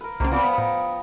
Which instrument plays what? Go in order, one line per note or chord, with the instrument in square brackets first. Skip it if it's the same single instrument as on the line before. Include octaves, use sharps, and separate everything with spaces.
[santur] A#4 B4
[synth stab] C2 C#3 [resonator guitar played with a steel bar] A#3 [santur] C5 F#5 G5
[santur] F3 B4 G5 [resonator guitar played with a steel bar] B3 C4 D5
[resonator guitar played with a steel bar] B3 [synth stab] B5 [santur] D#6
[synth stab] A2 [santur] A#5